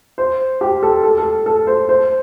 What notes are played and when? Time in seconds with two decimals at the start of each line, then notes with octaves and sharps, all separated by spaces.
0.18 C5
0.61 G4
0.83 A4
1.03 A4
1.18 A4
1.46 A4
1.67 C5
1.89 C5